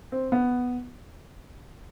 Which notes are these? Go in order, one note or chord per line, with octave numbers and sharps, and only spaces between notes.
C4
B3